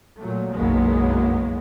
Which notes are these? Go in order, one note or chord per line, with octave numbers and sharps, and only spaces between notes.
A#2 F#3 A3
F#1 B1 F#3 G#3 A#3 B3